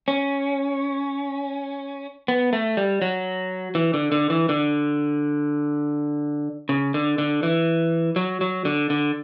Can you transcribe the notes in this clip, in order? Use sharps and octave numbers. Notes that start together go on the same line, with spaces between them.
C#4
B3
A3
G3
F#3
E3
D3
D3
E3
D3
C#3
D3
D3
E3
F#3
F#3
D3
D3